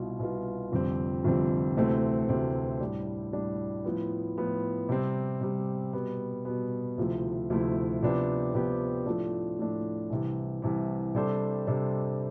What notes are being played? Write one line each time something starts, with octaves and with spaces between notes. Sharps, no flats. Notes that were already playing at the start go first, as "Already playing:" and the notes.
Already playing: C2 B2 B3 F4
C2 B2 B3 F4
F1 F2 D3 G3 C4
F1 F2 D3 G3 C4
D2 C3 E3 A3 C4
D2 C3 E3 A3 C4
A2 G3 D4
A2 G3 D4
A2 F3 B3
A2 F3 B3
C3 G3 C4
C3 G3 C4
B2 G3 B3
B2 G3 B3
D2 C3 F3 A3 E4
D2 C3 F3 A3 E4
C3 F3 B3 D4 G4
C3 F3 B3 D4 G4
A2 F3 A3 D4
A2 F3 A3 D4
C2 C3 E3
C2 C3 E3
C3 G3 D4 A4 C5
C3 G3 D4 A4 C5